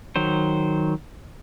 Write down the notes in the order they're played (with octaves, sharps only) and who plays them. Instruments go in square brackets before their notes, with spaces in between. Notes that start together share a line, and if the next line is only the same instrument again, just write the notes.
[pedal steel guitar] D#3 F#3 C5